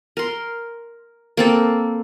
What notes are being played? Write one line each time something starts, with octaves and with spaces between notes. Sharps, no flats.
A#4 C6
A#3 C4 A4